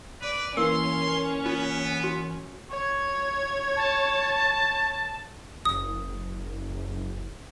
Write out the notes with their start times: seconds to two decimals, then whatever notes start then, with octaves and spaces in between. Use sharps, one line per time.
0.22 B4 D5
0.57 E3 A#3 C#4 C6 E6
1.45 B3 F4
2.04 F#4
2.70 C#5 G#6
3.76 A5
5.65 F#1 D#6